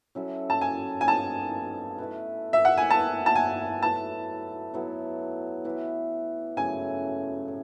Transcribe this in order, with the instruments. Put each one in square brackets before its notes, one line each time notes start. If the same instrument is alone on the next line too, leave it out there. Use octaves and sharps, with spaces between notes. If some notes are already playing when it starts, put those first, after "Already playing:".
[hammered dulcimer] F#3 C#4 E4 A4
[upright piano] A5
G#5
G#5
[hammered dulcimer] B3 D#4 A4 [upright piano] A5
[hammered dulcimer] A3 E4 B4
[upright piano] E5
F#5
G#5
[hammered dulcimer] B3 E4 B4 [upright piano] A5
[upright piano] A5
G#5
[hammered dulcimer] F#3 A3 E4 B4 [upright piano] A5
[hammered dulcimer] F#3 B3 E4 A4
E3 B3 E4
[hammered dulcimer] C#3 F#3 A3 [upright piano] G#5
[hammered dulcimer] A2